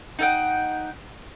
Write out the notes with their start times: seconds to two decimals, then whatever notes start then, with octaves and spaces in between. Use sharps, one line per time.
0.19 D#4 F#5 G5